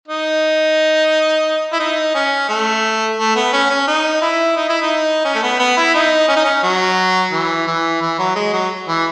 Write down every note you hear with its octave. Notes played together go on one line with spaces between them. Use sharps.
D#4
E4
D#4
C#4
A3
A3
B3
C#4
C#4
D#4
E4
D#4
E4
D#4
C#4
A3
B3
B3
E4
D#4
C#4
D#4
C#4
F#3
E3
E3
E3
F#3
G#3
F#3
E3